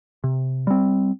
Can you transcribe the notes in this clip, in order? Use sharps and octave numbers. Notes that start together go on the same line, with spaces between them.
C3
G3 C4